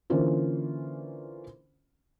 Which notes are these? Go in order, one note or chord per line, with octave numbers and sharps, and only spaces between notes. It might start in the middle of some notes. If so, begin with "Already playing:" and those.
D3 E3 A#3 C#4 F4 C5